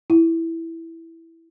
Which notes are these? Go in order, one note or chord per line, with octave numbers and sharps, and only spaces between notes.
E4